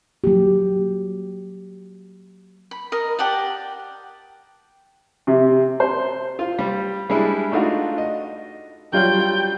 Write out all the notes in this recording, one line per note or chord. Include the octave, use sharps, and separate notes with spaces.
F#3 A#3 G4
B5
A#4 D#5
G4 D5 F#5 A5
C3
C5
F4
G3
G3 G#3 D4 E4
A3 D4 D#4 F4 F#4
D#5
F#3 G3 F4 G5 G6